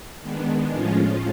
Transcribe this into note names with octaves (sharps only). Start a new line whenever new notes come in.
D#3 G#3 B3 D4
A2 F3 G#3 C#4 F4